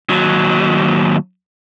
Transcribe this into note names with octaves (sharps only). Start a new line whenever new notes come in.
D#2 F#3